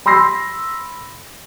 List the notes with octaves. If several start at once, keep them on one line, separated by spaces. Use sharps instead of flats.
B5 C6 E6 A#6 C7